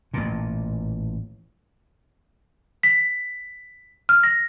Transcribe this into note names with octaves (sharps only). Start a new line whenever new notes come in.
A1 A#2
B6
F6
A#6